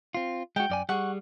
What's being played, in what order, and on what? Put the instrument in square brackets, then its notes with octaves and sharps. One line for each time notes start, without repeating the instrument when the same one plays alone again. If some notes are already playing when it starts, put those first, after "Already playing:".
[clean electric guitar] C4 F4
[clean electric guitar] G#3 F#4 [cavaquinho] G5
[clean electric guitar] F#2 D5 G#5
[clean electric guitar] G3 G#4 [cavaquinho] F#5 C#6